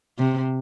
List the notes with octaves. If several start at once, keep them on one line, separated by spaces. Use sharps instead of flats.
C3